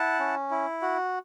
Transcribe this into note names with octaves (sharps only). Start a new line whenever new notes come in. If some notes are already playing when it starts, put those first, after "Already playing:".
Already playing: E4 F#5 A5
C#4
E4
F#4